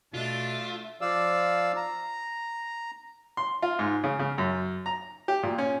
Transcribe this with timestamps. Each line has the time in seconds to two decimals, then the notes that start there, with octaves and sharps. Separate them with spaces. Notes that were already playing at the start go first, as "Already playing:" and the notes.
0.14 B2 A3 D4 F4 E5
1.01 F3 D5 F5 E6
1.76 A#5
3.37 C6
3.62 F4
3.79 G#2
4.04 C#3
4.19 C#3
4.38 F#2
4.86 A#5
5.28 G4
5.43 A#2
5.58 C#4